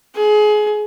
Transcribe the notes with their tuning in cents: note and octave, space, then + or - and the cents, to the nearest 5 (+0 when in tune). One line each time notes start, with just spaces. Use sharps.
G#4 +25